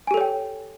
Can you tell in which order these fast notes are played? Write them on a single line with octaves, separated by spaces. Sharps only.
G#5 G4 A4 C#5 G5